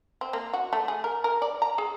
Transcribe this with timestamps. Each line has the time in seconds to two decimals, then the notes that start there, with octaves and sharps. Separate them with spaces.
0.21 C4
0.33 A#3
0.54 F#4
0.73 A3
0.88 G#4
1.04 A#4
1.24 A#4
1.42 D5
1.62 A#5
1.78 G#4